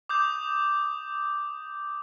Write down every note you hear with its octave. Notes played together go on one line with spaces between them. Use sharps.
D6 D#6 G6